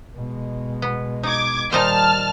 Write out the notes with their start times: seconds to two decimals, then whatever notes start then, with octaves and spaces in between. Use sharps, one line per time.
0.15 B2 G#3
0.82 B3
1.23 D#4 D6 G#6
1.73 A#2 D#3 G3 D#4 C5 A5 F6